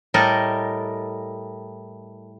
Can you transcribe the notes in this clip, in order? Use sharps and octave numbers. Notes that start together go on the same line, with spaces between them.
A2 G3 A4 A#4 D#5